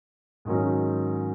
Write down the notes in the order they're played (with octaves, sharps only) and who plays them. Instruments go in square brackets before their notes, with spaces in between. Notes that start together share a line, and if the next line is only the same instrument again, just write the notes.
[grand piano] G#2 D#3 F#3 C#4